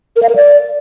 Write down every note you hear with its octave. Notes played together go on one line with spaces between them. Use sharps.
A#4
F5
A#4
D5